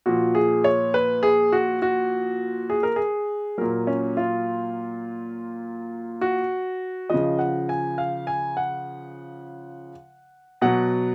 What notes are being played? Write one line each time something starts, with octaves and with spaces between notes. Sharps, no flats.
A#2 F3 F#4
G#4
C#5
B4
G#4
F#4
F#4
G#4
A#4
G#4
A#2 F#3 A#4
C#4
F4
F#4
C#3 F3 D#5
F#5
G#5
F5
G#5
F#5
B2 F#3 F#5